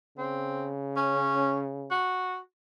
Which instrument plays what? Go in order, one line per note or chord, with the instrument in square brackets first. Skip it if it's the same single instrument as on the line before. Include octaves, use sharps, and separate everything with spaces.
[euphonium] C#3 [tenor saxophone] C4
[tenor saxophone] C#4
F#4